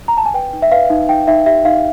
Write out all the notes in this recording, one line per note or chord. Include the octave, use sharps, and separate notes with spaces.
A#5
A5
G#5
B4 G5
D#4
E5
B4 F5
D#4
D#4 G5
D#4 E5
G4 E5
D#4 F5